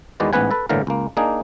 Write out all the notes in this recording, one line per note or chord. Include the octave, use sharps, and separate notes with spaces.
E2 D#3 G#3 B3 F#4 D5
A1 G#2 B3 B4 F#5 G#5
A4 B4
G1 A2 D3 E3 A#3 A#4
C#2 A#3
A#3 D4 D#4 G#4